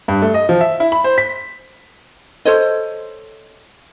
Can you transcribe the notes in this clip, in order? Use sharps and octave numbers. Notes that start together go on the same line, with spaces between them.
G2
A3
D#5
F3
E5
E4
B5
C5
B6
A4 C5 C#5 D#5